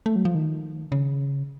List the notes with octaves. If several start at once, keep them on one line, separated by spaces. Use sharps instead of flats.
A3
F#3
F3
D#3
C#3